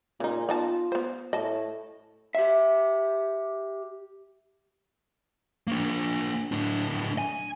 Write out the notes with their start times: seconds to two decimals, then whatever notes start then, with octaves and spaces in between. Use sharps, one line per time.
0.20 A#2 C#3 D#4
0.49 B3 D#4 F4 A5
0.92 B3 C5
1.33 A2 D#5 A5
2.35 G4 E5
5.67 A#3 D4
6.52 A2 D4
7.18 G#5